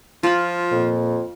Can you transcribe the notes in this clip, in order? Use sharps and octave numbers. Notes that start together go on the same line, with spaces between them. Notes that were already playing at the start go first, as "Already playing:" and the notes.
F3 F4 B5
F2 A#2